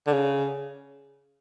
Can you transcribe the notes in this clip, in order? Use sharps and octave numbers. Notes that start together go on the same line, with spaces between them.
D3
C#3